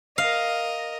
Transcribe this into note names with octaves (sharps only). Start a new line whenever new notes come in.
A#4 D#5 F5